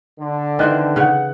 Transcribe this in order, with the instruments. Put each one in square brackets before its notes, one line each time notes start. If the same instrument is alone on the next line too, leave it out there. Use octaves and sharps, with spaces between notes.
[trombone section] D3
[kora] D#3 E3 C4 [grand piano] G5 F#6
[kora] C#3 C#5 [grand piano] F#5 F#6